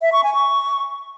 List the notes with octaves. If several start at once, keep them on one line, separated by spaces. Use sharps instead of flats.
E5
C#6
G#5
C#6